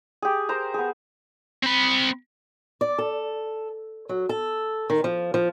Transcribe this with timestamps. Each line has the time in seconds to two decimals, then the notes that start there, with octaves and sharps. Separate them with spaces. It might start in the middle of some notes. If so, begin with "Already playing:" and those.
0.22 G4 G#4
0.49 A#4 C5 A#5
0.74 B3 G#4
1.63 C4 B5
2.81 D5
2.98 A4
4.09 F#3
4.29 A4
4.90 D#3
5.04 F3
5.34 F3